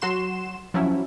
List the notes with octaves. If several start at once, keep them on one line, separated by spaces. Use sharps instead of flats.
F#3 F#4 C6 E7
F3 F#3 C#4 E4